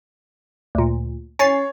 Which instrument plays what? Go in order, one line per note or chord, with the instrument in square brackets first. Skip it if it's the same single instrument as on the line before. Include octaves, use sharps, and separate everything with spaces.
[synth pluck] D2 A#2
[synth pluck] C#4 A6 C7 [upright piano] C#5